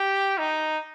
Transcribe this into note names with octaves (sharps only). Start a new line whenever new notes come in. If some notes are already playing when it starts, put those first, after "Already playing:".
Already playing: G4
D#4